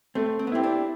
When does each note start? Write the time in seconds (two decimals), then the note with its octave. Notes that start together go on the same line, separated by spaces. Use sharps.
0.15 A3 C4
0.39 C4
0.47 B3
0.52 C4 E4 G4
0.63 D4